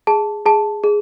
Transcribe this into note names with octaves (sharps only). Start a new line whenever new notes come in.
G#4 A5
G#4 A5
G#4